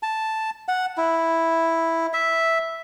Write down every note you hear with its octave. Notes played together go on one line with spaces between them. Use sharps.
A5
F#5
E4
E5